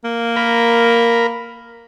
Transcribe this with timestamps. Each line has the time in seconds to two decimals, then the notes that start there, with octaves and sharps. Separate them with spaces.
0.04 A#3
0.36 A#4 B5